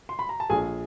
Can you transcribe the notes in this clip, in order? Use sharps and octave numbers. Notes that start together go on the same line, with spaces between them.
C6
B5
A#5
A5
A#1 G#4 G#5